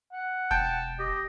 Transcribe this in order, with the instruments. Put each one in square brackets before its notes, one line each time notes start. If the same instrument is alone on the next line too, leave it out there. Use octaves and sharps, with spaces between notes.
[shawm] F#5
[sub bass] E1 [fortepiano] G5 [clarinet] A5
[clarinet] G4 [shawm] D#5